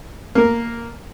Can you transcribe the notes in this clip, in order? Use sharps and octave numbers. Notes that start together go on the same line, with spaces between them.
A#3 A#4